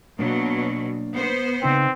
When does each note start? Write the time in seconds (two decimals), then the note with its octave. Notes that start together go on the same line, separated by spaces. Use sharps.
0.19 B2 F#3 A#3 D4
1.17 B3 C5
1.62 C#3 C4 D#4 B4